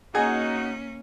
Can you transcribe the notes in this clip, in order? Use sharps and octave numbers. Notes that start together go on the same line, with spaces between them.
A#3 C#4 D#4 F#4 G#4